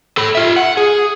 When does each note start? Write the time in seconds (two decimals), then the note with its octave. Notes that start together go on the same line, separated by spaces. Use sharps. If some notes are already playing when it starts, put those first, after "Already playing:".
0.17 A4 B5
0.35 F4 E5
0.56 F#5
0.77 G#4